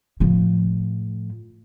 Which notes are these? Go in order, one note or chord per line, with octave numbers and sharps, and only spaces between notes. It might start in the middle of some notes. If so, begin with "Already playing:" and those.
A2 F3